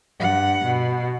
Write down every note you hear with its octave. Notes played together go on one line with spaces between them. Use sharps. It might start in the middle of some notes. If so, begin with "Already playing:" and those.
G2 F#5
B2